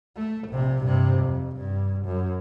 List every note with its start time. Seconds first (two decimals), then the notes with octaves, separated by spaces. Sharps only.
0.16 A3
0.49 A#1 C3
0.84 G2 C3
1.20 F2
1.56 G2
2.06 F#2